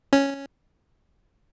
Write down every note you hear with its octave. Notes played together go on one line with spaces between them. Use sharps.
C#4